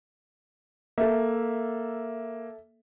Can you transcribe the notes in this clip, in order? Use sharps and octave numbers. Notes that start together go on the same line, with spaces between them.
A#3 A4 E5